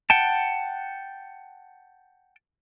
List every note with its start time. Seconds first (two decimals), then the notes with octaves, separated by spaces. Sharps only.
0.10 F#5 G5 A5